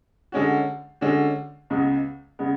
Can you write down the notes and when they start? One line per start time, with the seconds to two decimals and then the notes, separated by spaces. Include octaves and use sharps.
0.32 D3 G#3 C#4 F#4
1.01 D3 G#3 C#4 F#4
1.70 C#2 C#3 G#3 B3
2.39 C#3 G#3 B3